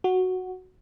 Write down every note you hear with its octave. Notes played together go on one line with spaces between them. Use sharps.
F#4